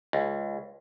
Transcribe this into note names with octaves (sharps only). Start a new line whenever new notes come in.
C#2